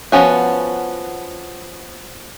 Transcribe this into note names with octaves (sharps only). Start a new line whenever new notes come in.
F3 B3 C#4 F#4